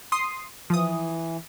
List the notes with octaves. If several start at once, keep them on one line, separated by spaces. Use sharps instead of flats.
C6 D#6 C7
E3 F3 D#6